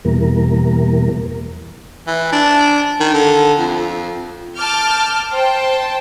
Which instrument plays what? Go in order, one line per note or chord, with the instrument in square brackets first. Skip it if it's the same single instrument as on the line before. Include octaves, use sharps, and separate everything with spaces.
[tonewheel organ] E2 B2 E3 G3 A#3 A#4
[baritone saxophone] E3
D4
D#3
D3
F2
[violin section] A5 D6 F6 G6
C5 G5 A5